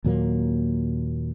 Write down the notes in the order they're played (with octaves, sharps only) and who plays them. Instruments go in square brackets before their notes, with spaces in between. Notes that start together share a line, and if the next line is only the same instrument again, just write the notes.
[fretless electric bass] D#2 A#2 F#3 A#3